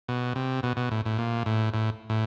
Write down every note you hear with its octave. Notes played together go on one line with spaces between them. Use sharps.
B2
C3
B2
B2
A2
A2
A#2
A2
A2
A2